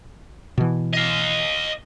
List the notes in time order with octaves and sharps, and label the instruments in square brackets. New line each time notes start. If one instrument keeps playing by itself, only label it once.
[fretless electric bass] B2 E3
[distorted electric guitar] D#5 F5